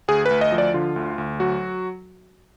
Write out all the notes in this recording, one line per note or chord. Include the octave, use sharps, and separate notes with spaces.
D2 G#4
D2 B4
D#5
F3
D5
D3 F4
D2
D2
F#3 F#4